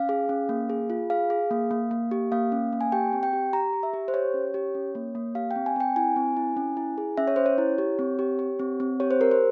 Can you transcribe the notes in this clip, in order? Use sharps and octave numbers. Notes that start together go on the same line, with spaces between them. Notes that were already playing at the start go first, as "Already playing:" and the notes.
Already playing: C#4 F5
G#4
C#4
A#3
G#4
F4
G#4 F5
G#4
A#3
A#3
A#3
G4
A#3 F5
C#4
A#3
G#5
G4 G5
C4
G5
G4
G4 A#5
G4
E5
G4
C5
G4 C#5
C#4
G4
C#4
A#3
A#3
G4 F5
G5
C4
G#5
C4 G5
E4 G#5
C4
E4
C#4
E4
G#4
C#4 E5
C#5
C#4 C5
C#5
E4
G4
C4
G4
G4
C4
C4
G4 C#5
C5
G4 A#4
C5